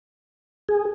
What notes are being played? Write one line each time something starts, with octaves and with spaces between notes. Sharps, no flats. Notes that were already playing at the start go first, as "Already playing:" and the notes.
G#4